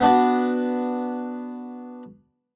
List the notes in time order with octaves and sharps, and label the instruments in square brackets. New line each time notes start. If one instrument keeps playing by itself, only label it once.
[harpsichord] B3 D4 F#4